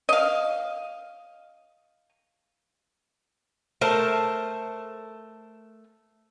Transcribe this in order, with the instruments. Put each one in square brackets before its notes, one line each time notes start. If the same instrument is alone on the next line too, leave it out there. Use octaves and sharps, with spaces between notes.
[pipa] D#5 F5
[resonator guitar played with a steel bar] A3 A#4 C5 A5